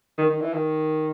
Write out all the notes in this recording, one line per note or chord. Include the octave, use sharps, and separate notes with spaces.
D#3
D#3
E3
D#3